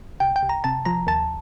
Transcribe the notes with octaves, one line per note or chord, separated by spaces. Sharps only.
C2 G5
G5
C2
A#5
C3 A5
F3 A#5
D#2 A5